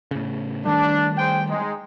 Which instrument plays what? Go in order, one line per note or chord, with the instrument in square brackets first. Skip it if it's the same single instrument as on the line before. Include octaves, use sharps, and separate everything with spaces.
[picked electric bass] A2 C#3
[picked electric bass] D#3 G3 A3 [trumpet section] D4
[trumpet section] G#4 C5 G5
G#3 D#4